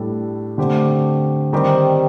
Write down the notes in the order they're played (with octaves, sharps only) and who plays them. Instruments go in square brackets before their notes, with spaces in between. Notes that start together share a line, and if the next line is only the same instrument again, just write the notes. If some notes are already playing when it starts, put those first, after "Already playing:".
Already playing: [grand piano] A2 G3 D4 A4
D3 A3 C4 G4
D#3 G3 C4 G4